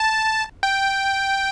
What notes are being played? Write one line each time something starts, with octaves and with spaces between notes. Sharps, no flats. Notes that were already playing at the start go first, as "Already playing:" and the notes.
Already playing: A5
G5